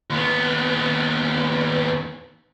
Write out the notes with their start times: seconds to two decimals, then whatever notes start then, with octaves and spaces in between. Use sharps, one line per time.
0.10 D#2 B3